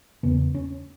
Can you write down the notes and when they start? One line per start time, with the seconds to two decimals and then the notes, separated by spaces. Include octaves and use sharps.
0.23 E2 C#3 B3
0.54 C#4